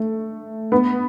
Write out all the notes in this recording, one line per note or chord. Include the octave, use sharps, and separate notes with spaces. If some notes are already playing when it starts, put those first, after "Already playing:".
Already playing: A3
B3